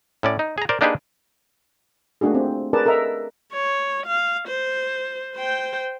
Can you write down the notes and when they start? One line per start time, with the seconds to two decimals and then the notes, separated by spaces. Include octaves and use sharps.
0.23 A2 C#4 D5
0.39 D#4
0.58 G#4 A#5
0.69 A#4 C5 D5
0.81 A#3 D4 D#4 G4 G#4 B4
2.21 A3 A#3 D4 F#4 G#4
2.34 C4
2.73 G#4 A#4 B4 D5 A5
2.86 A4 A#4 D#5 E5 A#5
3.53 C#5
4.06 F5
4.48 C5
5.35 C5 G5